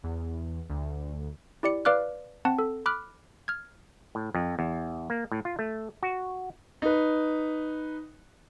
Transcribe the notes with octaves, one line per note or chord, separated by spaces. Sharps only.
E2
D2
E4 G4 D5 C#7
B4 D5 F5 D6 F6 F#6
C4 F#5 A5
A4
B5 D6 F6 F#6
F6 G#6
A2
F2
E2
A#3
A2
F4
A3
F#4
D#4 B4